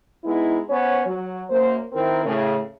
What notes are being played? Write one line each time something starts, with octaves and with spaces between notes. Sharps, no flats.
G#3 B3 D#4 E4
B3 C#4 C5 C#5
F#3
F#2 A#3 C5
D#3 C4 E4 A#4
A2 C#3